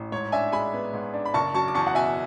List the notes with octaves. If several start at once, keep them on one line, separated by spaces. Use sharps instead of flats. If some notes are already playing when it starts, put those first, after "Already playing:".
Already playing: A1
G#2 C#5
D4 E5 G#5
G#3 G#5 B5
B3
G#2
D4
B5
F#1 A5 C#6
F#3 A5 C#6
D6
E2 A5 C#6
F#5
B2 E5 G#5